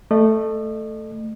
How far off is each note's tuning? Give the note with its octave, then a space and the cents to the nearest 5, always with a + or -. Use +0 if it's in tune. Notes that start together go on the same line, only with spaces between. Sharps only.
A3 +0 D#5 -40